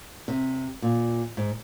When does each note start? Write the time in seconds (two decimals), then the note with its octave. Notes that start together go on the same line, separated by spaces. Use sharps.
0.28 C3
0.82 A#2
1.37 G#2